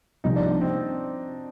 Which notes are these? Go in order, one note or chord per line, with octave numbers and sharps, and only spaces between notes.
C2 C3 F3 A#3 C#4 D#4
D4
C4